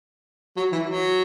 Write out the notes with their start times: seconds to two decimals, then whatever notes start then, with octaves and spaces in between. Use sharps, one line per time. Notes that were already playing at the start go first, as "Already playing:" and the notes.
0.57 F#3
0.72 E3
0.89 F#3